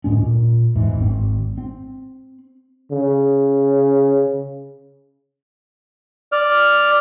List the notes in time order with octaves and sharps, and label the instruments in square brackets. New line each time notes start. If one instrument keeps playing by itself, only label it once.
[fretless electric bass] D1 A2 G#3 C#4
A#2
E2 G#2 E3
G#1 C4
C4
[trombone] C#3
[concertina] D5 F6